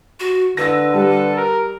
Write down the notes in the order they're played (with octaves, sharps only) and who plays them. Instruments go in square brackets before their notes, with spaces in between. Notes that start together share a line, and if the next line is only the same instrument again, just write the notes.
[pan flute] F#4
[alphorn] D3 [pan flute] B4 [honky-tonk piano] E6 A#6
[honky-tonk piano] G3 [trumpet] A4
[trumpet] A#4